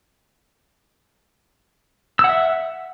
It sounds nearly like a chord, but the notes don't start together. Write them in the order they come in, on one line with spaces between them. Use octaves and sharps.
E6 F#5 E5